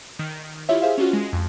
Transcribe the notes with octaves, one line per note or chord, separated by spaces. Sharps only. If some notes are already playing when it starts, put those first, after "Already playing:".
D#3
E4 F4 G4 C#5 E5
G#4 C5 E5 F5
C#4 D4 F4 F#4
G#3
F2